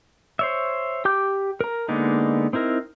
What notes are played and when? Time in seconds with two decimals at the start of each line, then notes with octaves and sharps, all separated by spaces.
0.39 C5 C#5 E5
1.05 G4 G5 D6 G6
1.61 A#4 A#5
1.88 D3 G#3 A#3 B3 D#4
2.53 C4 D#4 E4 A#4